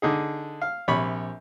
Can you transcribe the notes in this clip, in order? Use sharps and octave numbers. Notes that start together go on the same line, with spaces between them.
D3 D#4 G#4
F5
A#1 C3 C#5 B5